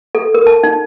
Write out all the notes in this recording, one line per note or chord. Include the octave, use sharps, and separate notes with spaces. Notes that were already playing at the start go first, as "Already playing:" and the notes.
A4
A#4
A5
D#4